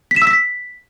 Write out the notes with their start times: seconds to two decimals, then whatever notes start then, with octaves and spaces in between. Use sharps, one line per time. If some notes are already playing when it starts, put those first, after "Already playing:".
0.11 B6
0.16 E7
0.22 E6
0.27 B6